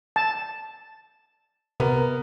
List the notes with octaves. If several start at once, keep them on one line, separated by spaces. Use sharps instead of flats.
A5
C3 B3 A#4